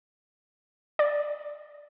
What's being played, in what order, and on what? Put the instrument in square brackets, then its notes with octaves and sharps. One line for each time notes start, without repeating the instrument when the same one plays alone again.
[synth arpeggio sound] D5